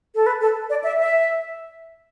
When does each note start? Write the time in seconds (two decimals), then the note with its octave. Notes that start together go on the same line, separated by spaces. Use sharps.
0.15 A4
0.26 B4
0.41 A4
0.70 D5
0.84 E5
0.99 E5